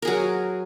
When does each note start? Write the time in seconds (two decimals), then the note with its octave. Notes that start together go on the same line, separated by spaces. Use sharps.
0.02 A#4
0.05 G#4
0.07 F#3